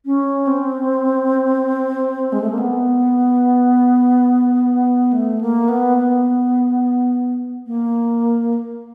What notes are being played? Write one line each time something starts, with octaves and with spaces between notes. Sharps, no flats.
C#4
C4
G#3
A3
A#3
B3
A3
A#3
B3
B3
A#3